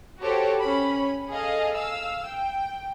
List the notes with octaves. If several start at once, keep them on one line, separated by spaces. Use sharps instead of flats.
F#4 G4 A4 C5 C#5
C#4 B5
G#4 A4 D#5 F5
F5 E6
G5